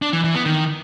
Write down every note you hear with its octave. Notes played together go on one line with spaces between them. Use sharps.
D4
E3
E3
B3
D#3